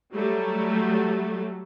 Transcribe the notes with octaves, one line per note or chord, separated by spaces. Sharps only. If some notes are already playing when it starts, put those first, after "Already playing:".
F#3 G3 A3